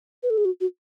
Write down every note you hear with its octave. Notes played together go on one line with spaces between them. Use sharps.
B4
A4
G#4
F#4
F#4